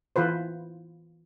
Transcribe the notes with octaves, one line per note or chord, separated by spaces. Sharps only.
E3 F4 B4 C5